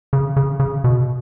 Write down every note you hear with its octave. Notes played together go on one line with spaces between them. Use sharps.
C#3
C#3
C#3
B2